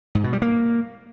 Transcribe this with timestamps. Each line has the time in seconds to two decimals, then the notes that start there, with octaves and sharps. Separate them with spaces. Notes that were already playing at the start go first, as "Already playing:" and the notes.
0.15 G#2
0.24 B2
0.33 G3
0.42 A#3